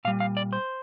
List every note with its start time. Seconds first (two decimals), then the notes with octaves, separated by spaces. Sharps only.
0.05 A#2 G3 F5
0.20 F5
0.37 D5
0.53 C5